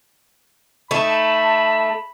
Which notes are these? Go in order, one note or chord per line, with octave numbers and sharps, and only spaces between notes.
A3 D#4 A5 B5